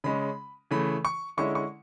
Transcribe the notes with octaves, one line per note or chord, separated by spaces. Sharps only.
C#3 G#3 C#4 B5
C#3 E3 A3 B5
C#6
D3 G#3 C#4 E4 C#6
C#6